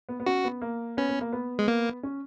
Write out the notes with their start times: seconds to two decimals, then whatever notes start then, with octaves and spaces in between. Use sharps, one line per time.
0.09 B3
0.20 B3
0.26 C#4 F#4
0.44 B3
0.62 A#3
0.97 B3 C#4
1.09 B3
1.21 A#3
1.33 B3
1.59 G#3
1.68 A#3
2.03 C#4